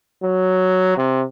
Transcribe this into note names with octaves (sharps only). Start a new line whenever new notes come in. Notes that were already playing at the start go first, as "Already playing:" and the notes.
F#3
C3